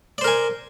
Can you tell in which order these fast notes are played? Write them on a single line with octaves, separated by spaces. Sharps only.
D5 C5 A#4 G#5